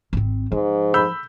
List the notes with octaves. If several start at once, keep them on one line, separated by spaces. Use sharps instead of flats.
G#1 C4
G#2 F3
B5 E6 G6